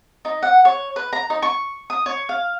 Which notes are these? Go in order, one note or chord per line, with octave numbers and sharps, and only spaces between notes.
D#4
F#5
C#5
B4
A#5
D#4
C#6
D#6
C#5
F5